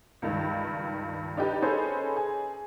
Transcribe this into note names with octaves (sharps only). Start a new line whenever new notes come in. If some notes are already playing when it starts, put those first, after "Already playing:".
C#2 G2 D#3
D4 D#4 G4 B4
C#4 G#4 A4 B4 C5 D#5
G#4